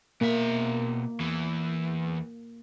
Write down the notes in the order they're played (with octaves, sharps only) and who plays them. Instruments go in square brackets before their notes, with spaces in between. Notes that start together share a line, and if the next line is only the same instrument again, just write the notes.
[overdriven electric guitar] B2 E5 [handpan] A#3
[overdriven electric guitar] E2 E3